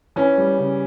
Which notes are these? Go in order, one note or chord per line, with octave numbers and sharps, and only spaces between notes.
E3 C#4
G3
C#3